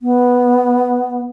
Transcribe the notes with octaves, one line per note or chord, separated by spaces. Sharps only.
B3